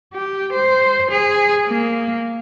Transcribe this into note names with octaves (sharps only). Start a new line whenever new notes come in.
G4
C5
G#4
A#3